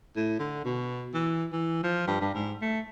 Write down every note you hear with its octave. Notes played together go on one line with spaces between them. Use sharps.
A2
D3
B2
E3
E3
F3
G2
G2
G#2
A3